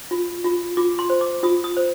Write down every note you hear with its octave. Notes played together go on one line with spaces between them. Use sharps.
F4
F4
F4 D6
C6
C5
D6
F4 D#6
D#6
C5